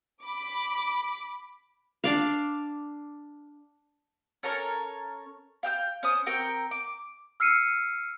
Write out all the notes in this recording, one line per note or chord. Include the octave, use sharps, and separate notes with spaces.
B5 D6
D4 D5 F5
C#4 A4 A#4 C#5
F5 G5 E6 G6
C#4 C5 D#6
C4 A#4 G5 C#6
D6
E6 F6 C7 C#7 D#7